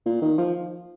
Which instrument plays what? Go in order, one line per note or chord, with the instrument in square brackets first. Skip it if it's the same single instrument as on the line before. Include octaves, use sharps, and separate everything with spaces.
[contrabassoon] A#2
D#3
F3